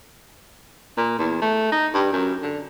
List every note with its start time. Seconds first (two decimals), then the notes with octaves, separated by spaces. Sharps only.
0.97 A#2
1.19 E2
1.42 A3
1.72 D#4
1.94 G2
2.13 F#2
2.43 D3